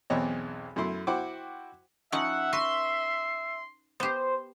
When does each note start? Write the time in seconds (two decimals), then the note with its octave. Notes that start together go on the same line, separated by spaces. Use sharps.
0.10 B1 E2 E3 C4 C#5 D#5
0.76 F#2 A3 E4 C6
1.07 E4 F#4 C5 F#5 G5 D6
2.12 F3 C#4 D#4 E5 F#5
2.53 F#4 B4 C6
4.00 B3 G4 C5